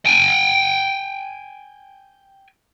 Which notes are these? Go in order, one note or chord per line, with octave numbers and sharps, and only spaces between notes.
G5 G#5